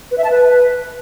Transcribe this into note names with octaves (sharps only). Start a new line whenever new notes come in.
B4
E5
A5
B4